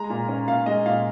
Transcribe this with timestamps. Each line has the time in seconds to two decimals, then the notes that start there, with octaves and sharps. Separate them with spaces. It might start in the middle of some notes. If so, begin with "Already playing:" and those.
Already playing: G#3 A#5
0.10 A#2
0.29 C#4
0.47 A#2 F5
0.66 G#3 D#5
0.86 A#2 F5